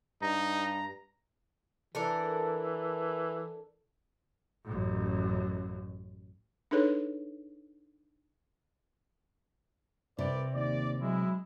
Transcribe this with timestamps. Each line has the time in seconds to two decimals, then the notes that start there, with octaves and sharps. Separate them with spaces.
0.22 G2 D#4 A#5
1.95 E3 D4 A4 A#4
4.65 A1 F#2
6.71 D4 D#4 G#4 A4 B4 C#5
10.19 C2 C3 B4 D5
10.54 D#2 D5
11.01 F#3 G#3 E4